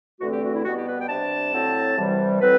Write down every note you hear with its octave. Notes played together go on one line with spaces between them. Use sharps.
E2 D3 A3 C4 F#4
G4
F#4
E4
B2 G3 B3 F#4
G4
B4
G5
C3 G3 D4 A5
A2 F#3 C4
C2 C3 E3 G3
A2 F#3 C4 B4